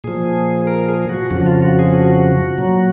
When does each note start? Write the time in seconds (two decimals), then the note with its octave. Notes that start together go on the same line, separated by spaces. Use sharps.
0.04 A#2 F3 G#4
0.67 A#4
0.88 G#4
1.09 F#4
1.30 F2 C#3 F3 F#4
1.41 F#4
1.46 F4
1.62 F#4
1.79 G#4
1.94 F#4
2.58 A#2 F#3